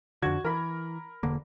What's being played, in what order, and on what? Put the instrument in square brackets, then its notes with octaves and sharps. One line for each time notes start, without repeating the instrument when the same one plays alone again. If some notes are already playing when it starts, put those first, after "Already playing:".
[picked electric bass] F2 D3 [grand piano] F#4 G#6
[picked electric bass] E3 [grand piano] A#4 B5
[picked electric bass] E1 D3 A#3